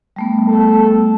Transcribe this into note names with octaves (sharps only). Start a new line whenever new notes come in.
G3 A3 B3
A4